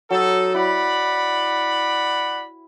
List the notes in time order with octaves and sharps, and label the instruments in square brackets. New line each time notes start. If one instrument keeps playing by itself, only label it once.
[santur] F#3 [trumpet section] D#4 A4
[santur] E4 [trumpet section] D5 F#5 B5